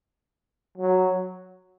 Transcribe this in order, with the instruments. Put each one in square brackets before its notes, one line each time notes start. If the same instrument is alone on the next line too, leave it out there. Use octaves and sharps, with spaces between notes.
[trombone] F#3